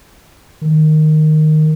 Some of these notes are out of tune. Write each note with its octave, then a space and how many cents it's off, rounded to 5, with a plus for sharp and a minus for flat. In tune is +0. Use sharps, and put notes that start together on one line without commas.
D#3 -10